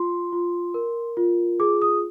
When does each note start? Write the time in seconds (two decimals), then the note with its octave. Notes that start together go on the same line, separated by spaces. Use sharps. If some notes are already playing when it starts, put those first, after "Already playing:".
Already playing: F4 C6
0.32 F4
0.74 A#4
1.17 F4
1.60 G#4 D6
1.82 D#6